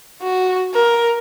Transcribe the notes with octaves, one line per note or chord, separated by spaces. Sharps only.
F#4
A#4